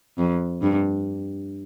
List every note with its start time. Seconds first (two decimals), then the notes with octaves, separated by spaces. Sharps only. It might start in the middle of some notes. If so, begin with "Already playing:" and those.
0.18 F2
0.62 G2